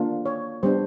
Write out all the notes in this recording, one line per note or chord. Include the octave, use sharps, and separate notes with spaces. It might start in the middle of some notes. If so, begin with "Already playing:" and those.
Already playing: A#3 D4 F4
C#5
G3 B3 D4 C5